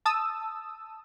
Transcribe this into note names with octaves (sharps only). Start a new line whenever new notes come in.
A5 D#6 E6